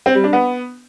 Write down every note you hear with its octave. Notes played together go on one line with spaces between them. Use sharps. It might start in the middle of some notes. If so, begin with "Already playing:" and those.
C4
G3
D4
B3